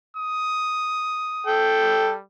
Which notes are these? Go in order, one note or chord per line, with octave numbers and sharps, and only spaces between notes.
D#6
A4 G5
G3